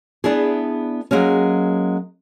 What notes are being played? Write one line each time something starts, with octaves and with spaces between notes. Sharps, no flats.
B3 D4 E4 G#4
F#3 G#3 A#3 C#4